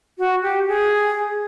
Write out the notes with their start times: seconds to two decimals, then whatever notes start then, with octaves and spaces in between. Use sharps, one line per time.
0.19 F#4
0.43 G4
0.68 G#4